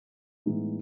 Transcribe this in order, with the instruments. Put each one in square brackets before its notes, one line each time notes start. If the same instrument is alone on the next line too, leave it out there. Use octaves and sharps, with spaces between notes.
[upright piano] A2 E3 G#3 B3 D#4